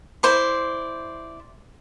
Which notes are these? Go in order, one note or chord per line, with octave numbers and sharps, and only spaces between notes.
E4 C5 D5